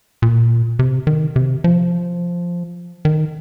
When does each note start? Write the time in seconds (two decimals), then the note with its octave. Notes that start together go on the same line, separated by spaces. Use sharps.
0.22 A#2
0.79 C3
1.07 D#3
1.36 C3
1.64 F3
3.05 D#3